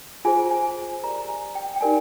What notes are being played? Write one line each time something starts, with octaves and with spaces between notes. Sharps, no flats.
F4 G#4 C5 G#5
G#5
G4 A#4 D5 A#5
G#5
G5
G5
D#4 G4 A#4 D5 G#5